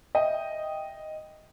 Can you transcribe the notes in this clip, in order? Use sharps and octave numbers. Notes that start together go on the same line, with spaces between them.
D#5 E5 G5